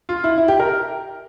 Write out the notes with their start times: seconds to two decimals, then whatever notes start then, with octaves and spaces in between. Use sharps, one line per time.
0.09 F4
0.24 E4
0.38 E4
0.48 G4
0.60 A#4